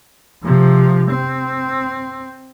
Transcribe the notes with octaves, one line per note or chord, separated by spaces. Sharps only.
C3 F3
C4